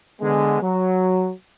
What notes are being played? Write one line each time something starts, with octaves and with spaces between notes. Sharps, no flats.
D3 G#3 B3
F#3